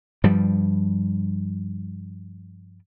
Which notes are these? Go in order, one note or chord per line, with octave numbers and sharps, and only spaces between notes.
G2 F3 G3